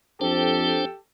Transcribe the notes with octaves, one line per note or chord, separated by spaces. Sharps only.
F2 D4 G4 A4 C5 G5